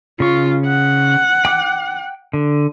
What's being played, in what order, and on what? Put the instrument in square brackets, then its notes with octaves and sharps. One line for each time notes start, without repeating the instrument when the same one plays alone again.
[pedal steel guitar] C#3 C#6 [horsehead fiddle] F4
[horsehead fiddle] F#5
[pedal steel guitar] G5 D6 F#6
D3